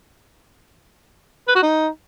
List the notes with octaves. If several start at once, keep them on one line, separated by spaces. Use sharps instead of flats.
B4
F#4
D#4